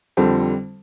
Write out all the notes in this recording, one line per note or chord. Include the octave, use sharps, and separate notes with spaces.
F2 D3 G3 C4